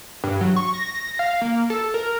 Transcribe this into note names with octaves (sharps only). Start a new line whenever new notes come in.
G2
F#3
C#6
A#6
F5
A#3
A4
A#4